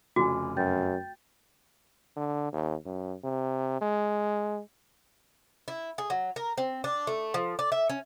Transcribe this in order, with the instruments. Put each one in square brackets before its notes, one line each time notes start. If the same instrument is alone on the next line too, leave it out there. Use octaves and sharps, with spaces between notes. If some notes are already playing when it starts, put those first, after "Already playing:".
[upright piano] F1 F2 C#3 [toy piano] F#4 [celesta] G#5 D6
[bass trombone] F#2 [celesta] G5 G6 A6
[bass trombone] D3
D#2
F#2
C3
G#3
[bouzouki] E4
G#4
F#3
A#4
C4
D4
A3
F3
D5
E5
C#4